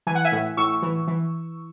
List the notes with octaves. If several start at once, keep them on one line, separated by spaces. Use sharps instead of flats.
E3 G#5
F#5
E5 G#5
A2
A2 C#6 E6
E3
E3